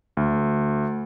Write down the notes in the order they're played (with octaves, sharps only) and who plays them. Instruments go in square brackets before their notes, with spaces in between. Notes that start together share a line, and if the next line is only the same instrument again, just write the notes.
[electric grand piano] D2